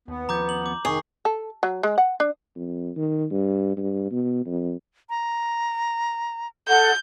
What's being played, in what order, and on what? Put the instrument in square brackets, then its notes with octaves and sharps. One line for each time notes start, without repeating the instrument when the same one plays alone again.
[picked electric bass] D#2 [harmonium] B3
[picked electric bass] D#2 F3 [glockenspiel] A#5 D6 G6
[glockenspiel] F#7
D6
[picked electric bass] F1 [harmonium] D#3 [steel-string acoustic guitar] G#4 [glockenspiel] C#6 C7
[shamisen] A4
F#3
G#3
F#5
D4
[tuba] F2
D#3
G2
G2
B2
F2
[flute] A#5
[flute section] A4 F#5 [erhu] G6